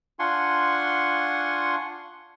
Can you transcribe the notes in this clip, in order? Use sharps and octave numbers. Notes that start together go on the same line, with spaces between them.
D4 F4 F#5 G#5 C6 C#6